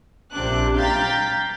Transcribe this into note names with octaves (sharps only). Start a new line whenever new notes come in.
A#1 C3 D4 F#6
F5 G5 A#5 G6 A6 B6